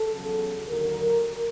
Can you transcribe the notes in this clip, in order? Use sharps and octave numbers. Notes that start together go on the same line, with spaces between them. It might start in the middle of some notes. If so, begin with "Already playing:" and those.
Already playing: A4
E2 C#3 F#3
D#2 D3 F#3 A#4